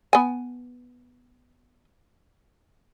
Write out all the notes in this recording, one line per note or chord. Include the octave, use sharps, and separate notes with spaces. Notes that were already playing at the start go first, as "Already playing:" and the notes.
B3 G#5